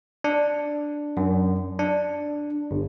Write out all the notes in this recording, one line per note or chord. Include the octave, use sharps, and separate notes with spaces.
D4
F#2
D4
G1